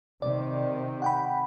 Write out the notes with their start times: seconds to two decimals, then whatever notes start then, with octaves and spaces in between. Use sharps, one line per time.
0.22 C3 D#3 D5
1.02 F#5 G5 B5